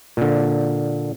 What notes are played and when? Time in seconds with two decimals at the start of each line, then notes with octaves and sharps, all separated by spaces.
0.17 A#2 D3